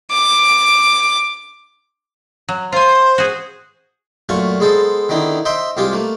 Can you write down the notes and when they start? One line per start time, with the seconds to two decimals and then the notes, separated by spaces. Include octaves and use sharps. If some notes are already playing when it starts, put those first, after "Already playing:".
0.12 D6
2.49 F#3
2.72 F4 C5 G#5 C6
3.18 F#4 G#4
4.29 F#2 A#2 A3 F4 C#6
4.60 G#3 B3 G#4 A4 C5
5.09 D3 D#3 B3 D#4 E4
5.45 C5 D#5 E5 G5 C6
5.77 C2 G#3 F4 G4 G#4
5.93 A3 A#3